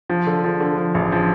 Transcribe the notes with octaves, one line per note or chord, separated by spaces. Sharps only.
F3
D3
F3
D3
F3
A1
F3